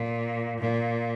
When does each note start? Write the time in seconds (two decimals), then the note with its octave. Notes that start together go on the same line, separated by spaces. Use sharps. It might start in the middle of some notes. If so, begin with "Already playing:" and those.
Already playing: A#2
0.60 A#2